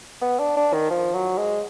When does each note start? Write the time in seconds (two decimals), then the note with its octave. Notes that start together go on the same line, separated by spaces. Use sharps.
0.21 B3
0.39 D4
0.56 D4
0.73 D#3
0.90 F3
1.14 F#3
1.37 G#3